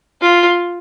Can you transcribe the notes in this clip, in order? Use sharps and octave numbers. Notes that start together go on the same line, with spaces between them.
F4